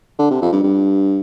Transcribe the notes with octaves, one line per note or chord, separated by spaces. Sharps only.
D3
C3
F2
G2
G2